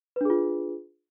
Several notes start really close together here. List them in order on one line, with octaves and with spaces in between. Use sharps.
B4 D4 G#4 F4